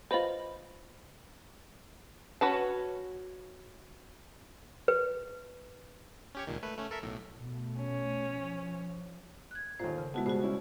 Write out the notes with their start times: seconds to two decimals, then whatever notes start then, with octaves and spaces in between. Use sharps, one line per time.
0.11 F4 B4 C5 D#5 B5
2.41 C#4 F#4 B4 A5
4.88 B4
6.35 C#4 G4 C#5
6.47 C#2 A#2 D#3
6.63 A3 B4
6.78 A3 C#4
6.91 A4 A#4 E5
7.02 B1 A2
7.37 B2 A3
7.78 C#4
8.30 F3
9.51 F#6 G#6
9.79 D#2 A#2 A4 C5
9.98 C#3
10.14 G#3 B3 E4 F#4 A5
10.26 B2 G3 F#4 G#4 C5
10.42 G3 C#4 E4